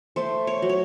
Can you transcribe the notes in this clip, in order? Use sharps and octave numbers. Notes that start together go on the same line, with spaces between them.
A3 C5
C#5
F#3
C#5